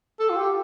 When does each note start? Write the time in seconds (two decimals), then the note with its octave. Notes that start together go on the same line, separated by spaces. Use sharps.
0.20 A4
0.30 F4
0.36 G4